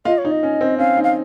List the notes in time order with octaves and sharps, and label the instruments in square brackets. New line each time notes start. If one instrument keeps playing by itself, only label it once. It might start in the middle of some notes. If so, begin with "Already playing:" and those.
[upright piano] F4 [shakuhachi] D#5
[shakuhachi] C#5
[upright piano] D#4
[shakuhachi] D#5
[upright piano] C#4
C4
[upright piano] C#4 [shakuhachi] F5
[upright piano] D#4
[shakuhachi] F5